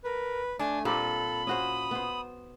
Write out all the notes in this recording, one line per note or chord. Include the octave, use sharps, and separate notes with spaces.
A#4 B4
A3 D4 G#5
A#2 G3 C4 G4 A4 B5
C#4 F#4 C5 D#6
B3 C5